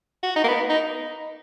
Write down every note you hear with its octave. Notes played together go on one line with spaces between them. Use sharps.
F#4
D#4
A#3
B3
D#4